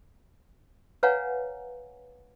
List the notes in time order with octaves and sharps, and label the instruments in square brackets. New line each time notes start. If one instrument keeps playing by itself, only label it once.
[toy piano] B4 C#5 F5 F#5 G#5 A#5